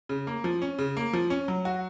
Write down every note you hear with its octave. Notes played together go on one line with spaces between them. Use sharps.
C#3
A#3
F3
C#4
C#3
A#3
F3
C#4
F#3
F#4